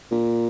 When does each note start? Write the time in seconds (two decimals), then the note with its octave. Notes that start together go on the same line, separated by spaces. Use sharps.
0.11 A#2